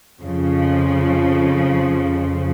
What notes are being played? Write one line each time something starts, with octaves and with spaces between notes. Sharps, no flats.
F2 C#3 F3